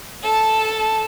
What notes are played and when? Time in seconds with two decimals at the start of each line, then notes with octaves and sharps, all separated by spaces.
0.23 A4 A5